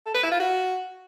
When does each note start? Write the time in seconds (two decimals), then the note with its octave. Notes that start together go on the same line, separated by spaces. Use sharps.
0.06 A4
0.14 B4
0.23 E4
0.31 F4
0.40 F#4